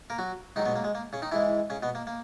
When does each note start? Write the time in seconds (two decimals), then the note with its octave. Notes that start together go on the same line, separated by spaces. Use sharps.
0.10 A#3 A#4
0.18 F#3 F#4
0.56 G#2 D#3 F#3 D#4
0.65 B2 B3
0.76 A#3
0.84 G#3
0.95 A#3
1.13 C#3 C#4
1.22 D#3 D#4
1.32 G#2 E3 G#3 E4
1.70 C#3 C#4
1.83 B2 B3
1.95 A#3
2.07 A#3